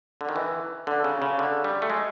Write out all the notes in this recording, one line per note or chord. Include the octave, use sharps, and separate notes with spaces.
D3
D#3
E3
D3
C#3
C#3
D3
G3
A3
G#3